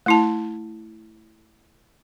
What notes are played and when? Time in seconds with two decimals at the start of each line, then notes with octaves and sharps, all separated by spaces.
0.06 A3 E4 A5